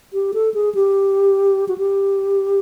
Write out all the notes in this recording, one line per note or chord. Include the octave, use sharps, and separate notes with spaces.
G4
A4
G#4
G4
F#4
G4